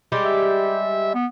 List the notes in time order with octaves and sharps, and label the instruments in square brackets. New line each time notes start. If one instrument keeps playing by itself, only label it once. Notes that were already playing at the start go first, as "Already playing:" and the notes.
[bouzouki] G3 G#3 G4
[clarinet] E5
B3